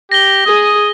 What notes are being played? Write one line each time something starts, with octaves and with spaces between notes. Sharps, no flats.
G4 A#6 G7
G#4 D#6